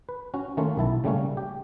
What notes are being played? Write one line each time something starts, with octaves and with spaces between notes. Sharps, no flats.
B4
C#4 F#4
D#3 A3 A#3 C#4 F4
B1 E4 A5
C#3 G3 A3 A#3 C#4
G4